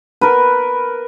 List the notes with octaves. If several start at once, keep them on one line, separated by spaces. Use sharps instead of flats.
A#4 B4